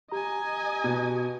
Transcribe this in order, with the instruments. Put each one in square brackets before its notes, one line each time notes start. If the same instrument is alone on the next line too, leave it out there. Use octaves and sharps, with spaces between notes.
[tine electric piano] G4 A#5 [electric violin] D#5 G#5
[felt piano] B2